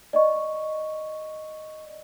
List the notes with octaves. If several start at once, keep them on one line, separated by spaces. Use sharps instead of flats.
D5 D#5 C#6